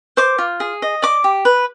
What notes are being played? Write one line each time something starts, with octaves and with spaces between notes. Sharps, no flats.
C5 D6
F4
G#4
D#5
D5 D6
G4
B4